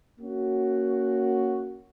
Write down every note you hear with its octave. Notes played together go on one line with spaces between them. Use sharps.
A#3 C#4 F#4